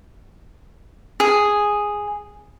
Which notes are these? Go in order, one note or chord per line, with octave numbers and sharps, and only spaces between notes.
G#4